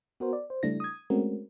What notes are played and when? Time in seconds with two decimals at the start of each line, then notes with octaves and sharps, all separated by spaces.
0.20 B3 F#4 A#4 C5
0.33 D5
0.50 C5
0.63 C#3 G3 A3 D4 E4 A#6
0.80 D#6 G#6
1.10 G#3 A3 C4 C#4 F#4 A#4